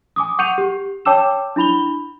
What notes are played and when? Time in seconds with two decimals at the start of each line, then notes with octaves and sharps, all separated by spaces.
0.16 G#5 D6 D#6
0.39 F#5 C#6 G6 C#7 D#7 F7
0.58 G4
1.05 C#5 G5 A5 D6 E6 E7
1.56 D4 E4 B5 F7 G7